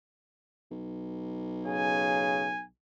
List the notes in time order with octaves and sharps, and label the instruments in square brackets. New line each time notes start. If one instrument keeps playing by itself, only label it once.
[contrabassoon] B1
[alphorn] C#3 [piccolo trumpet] G#5